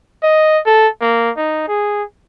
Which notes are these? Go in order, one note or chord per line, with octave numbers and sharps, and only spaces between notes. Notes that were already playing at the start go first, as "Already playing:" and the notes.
D#5
A4
A#3
D#4
G#4